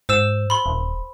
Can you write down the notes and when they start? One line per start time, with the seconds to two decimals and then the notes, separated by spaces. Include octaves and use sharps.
0.09 G#2 C5 E6 E7
0.50 B5 C6
0.66 D#1